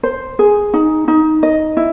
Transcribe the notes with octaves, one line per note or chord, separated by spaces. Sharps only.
C5
G#4
D#4
D#4
D#5
E4